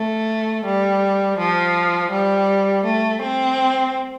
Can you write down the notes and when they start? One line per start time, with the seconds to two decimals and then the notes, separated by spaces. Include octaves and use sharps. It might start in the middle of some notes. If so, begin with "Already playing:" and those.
Already playing: A3
0.65 G3
1.38 F3
2.11 G3
2.85 A3
3.21 C4